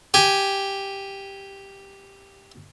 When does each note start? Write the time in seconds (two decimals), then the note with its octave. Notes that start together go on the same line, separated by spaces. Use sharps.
0.14 G4 G#5